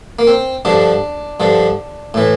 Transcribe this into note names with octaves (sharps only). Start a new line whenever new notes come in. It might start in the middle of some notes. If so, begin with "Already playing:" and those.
A#3
C4
G2 D3 F3 D4
G2 D3 F3
A2 E3